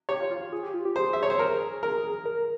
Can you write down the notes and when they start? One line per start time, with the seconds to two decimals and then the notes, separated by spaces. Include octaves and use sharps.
0.09 G4 C#5
0.20 F4
0.31 F4
0.41 F4
0.53 G#4
0.63 G4
0.74 F4
0.85 G4
0.96 G#4 C5
1.13 E5
1.23 C#5
1.30 C5
1.39 A#4
1.83 A#4
2.25 A#4